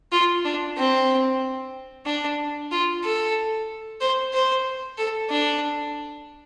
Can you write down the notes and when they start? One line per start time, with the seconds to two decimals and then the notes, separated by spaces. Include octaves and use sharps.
0.12 F4
0.45 D4
0.77 C4
2.06 D4
2.71 F4
3.03 A4
4.00 C5
4.33 C5
4.98 A4
5.30 D4